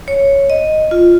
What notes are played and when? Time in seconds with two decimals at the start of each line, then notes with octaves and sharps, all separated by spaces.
0.08 C#5
0.50 D#5
0.91 F4